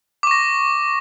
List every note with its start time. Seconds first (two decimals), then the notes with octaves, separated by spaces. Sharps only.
0.23 D6
0.27 C#6
0.31 A#6